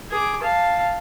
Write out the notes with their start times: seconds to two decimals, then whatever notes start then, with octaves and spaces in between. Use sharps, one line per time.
0.11 G#4 D6
0.42 F5 A5